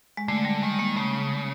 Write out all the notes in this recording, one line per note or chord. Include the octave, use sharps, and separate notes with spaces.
G#3
D3 A3
G3
D#3 G#3
A#3
C#3 A3